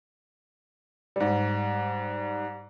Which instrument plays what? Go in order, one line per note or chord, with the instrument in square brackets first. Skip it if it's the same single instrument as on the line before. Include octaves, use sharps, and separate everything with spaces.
[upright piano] G#2 G3